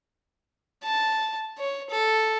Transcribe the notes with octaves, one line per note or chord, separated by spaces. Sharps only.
A5
C#5
A4